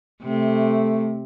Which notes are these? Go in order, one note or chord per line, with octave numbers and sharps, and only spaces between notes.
C3 A3